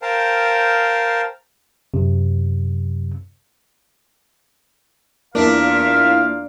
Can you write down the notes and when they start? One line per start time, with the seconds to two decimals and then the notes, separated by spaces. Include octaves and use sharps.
0.02 A#4 C5 F5 G5 A5
1.94 F#2 C3
5.35 E2 A#3 D4 E4 F4 A#4 E5 F5